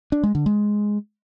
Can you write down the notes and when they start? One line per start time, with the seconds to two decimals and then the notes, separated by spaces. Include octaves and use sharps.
0.12 D4
0.23 G#3
0.35 D3
0.46 G#3